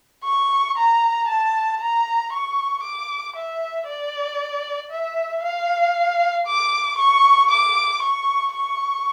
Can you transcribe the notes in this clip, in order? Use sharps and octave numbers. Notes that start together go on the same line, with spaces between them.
C#6
A#5
A5
A#5
C#6
D6
E5
D5
E5
F5
D6
C#6
D6
C#6
C#6